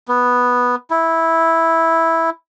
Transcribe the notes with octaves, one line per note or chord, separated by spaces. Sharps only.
B3
E4